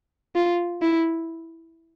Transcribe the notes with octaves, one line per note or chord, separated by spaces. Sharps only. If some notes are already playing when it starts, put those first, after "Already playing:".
F4
E4